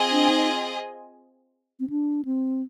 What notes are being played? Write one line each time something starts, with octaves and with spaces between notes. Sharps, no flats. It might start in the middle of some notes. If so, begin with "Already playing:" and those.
Already playing: C4 F4 G#4 D#5 G#5
D4
D#4
C4
D4
C4